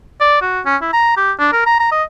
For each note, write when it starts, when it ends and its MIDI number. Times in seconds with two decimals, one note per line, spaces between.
0.21 0.40 74
0.41 0.60 66
0.65 0.76 61
0.82 0.91 64
0.93 1.16 82
1.17 1.32 67
1.39 1.49 62
1.53 1.65 70
1.66 1.80 82
1.80 1.90 82
1.92 2.03 75